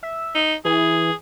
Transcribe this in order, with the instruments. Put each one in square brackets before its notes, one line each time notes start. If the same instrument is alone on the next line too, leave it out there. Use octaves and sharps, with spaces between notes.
[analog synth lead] E5
[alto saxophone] D#4
[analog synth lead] E3 [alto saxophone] G#4